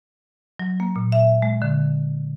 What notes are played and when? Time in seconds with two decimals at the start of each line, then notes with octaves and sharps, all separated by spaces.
0.59 F#3
0.80 A#3
0.96 A#2
1.12 E5
1.42 G#3
1.62 D3